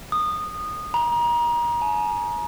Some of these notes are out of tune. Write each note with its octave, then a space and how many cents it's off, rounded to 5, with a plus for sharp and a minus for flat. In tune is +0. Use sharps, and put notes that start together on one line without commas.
D#6 -20
A#5 +30
G#5 +40